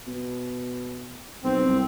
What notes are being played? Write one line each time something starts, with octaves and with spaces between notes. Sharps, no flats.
B2
B1 C4
C2